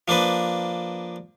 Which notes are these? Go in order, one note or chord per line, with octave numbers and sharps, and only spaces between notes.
F3 A#3 D4 B4